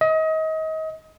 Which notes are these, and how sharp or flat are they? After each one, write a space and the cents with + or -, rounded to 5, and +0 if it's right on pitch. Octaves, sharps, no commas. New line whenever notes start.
D#5 +30